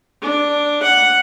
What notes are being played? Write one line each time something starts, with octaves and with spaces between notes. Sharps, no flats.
D4
F#5